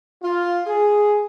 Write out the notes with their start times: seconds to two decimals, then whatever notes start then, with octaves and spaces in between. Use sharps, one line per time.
0.22 F4
0.66 G#4